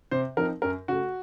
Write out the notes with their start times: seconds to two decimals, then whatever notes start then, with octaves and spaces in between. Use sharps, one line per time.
0.11 C3 C5
0.37 F3 C4 D#4 A#4
0.62 F#2 A#4
0.88 C#3 A3 F#4